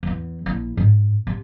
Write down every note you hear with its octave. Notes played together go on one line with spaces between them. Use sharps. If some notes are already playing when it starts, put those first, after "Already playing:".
E2 E3
A#1 E4
G#2
C3